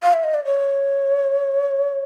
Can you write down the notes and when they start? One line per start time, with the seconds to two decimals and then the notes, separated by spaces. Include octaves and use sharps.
0.03 F5
0.13 E5
0.24 D#5
0.34 D5
0.45 C#5